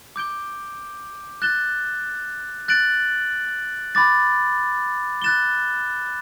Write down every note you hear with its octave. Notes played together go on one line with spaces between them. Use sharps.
D6 G6 D7 G7
F#6 A6 E7 G7
F#6 A6 D7 F#7
B5 D6 A6
F#6 A6 E7 G7